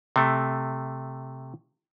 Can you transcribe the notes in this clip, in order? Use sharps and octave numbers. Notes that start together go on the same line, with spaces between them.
C3 A3